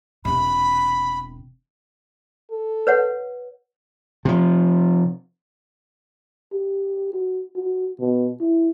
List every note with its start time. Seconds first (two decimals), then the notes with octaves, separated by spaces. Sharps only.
0.25 E1 C3 B5
2.51 A4
2.87 B4 C#5 F#5
4.25 C3 F3
6.53 G4
7.13 F#4
7.56 F#4
8.00 B2
8.40 E4